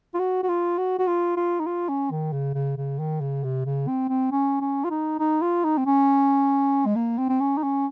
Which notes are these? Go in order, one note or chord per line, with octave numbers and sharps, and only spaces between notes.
F4
F#4
F#4
F4
F#4
F#4
F4
F4
D#4
F4
C#4
D#3
C#3
C#3
C#3
D#3
C#3
C3
C#3
C4
C4
C#4
C#4
F4
D#4
D#4
F4
D#4
C4
C#4
G#3
A#3
C4
C4
C#4
D#4
C#4